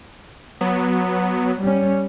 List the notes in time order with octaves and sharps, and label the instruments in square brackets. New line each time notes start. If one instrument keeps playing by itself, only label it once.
[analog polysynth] F#3 B3
[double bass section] G3 C#4